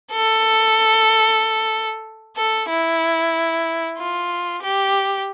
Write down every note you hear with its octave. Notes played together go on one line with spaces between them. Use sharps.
A4
A4
E4
F4
G4